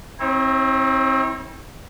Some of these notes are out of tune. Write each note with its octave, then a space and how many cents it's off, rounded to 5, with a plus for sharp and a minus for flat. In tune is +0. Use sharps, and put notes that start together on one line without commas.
C4 +20 E4 -40 C#5 -30